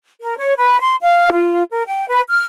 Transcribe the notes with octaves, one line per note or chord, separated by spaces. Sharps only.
A#4
C#5
B4
C6
F5
F4
A#4
G5
B4
F6